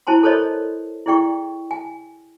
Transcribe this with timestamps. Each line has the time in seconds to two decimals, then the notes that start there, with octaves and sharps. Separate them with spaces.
0.07 E4 C5 G#5 A5 C6
0.23 A4 A#4 C5 C#5 D#5 B5
1.06 E4 G#4 D5 G5 C#6
1.71 G#5